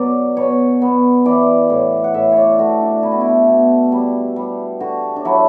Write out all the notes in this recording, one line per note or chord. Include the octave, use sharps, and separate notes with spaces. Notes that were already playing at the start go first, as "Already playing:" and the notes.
Already playing: B2 F#3 B4 D5
B2 C#5
B3
E3 D5
A2
F#5
A2 E5
C#5 D5
A3 F#4
D4
B2 E4
F#4
E4
B2
G3
G3
D3 F#4
D4
F#3 E4